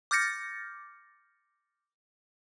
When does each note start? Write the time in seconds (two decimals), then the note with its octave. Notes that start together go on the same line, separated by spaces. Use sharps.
0.11 D6 F6 G6 A6 A#6 C#7